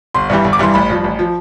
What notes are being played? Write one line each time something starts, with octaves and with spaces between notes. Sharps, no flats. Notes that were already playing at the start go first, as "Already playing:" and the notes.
G1 C6
G2 E3 G3
G1
D6
G2 E3 G3 C6
A1 B5
G2 F3
A1
F3